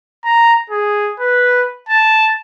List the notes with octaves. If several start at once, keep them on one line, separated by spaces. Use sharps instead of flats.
A#5
G#4
B4
A5